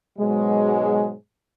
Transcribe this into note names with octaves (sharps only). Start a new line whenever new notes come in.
G#2 B2 F#3 G#3